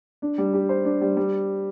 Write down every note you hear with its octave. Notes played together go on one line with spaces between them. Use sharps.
D4
G3
G4
C5
D4
G3
G3